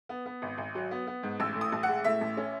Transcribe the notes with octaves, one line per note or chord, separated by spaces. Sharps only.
B3
B3
G#1
G#1
F#3
B3
B3
G#2
A1 E6
A2
D#6
A1
F#5
G#3
A2 E5
A1
C#4